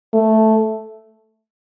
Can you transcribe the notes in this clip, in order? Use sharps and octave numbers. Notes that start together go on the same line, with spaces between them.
A3